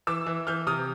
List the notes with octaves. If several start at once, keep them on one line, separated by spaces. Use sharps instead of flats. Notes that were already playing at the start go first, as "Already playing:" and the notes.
E3 D6 E6
E3
E3 F6 G6
C3 D#6 F6